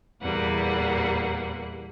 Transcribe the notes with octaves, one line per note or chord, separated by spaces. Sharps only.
E2 A#2 G3 A#3 F#5